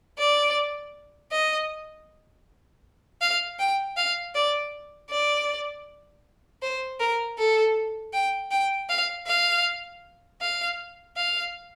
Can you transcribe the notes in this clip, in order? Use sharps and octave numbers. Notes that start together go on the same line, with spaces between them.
D5
D#5
F5
G5
F5
D5
D5
C5
A#4
A4
G5
G5
F5
F5
F5
F5